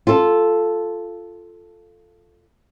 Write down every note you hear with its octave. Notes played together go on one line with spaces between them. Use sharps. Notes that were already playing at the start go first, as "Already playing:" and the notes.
F4 A4